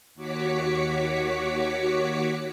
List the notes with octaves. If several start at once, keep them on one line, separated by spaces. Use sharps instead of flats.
D#2 F#4 C#5 D6 B6 C#7